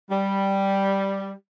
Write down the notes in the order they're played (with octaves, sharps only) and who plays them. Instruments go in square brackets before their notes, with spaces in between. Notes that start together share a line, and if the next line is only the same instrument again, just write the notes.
[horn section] G3